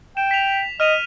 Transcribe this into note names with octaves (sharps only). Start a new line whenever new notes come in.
G5 E7
B6 F7
D#5 F6 D#7 F7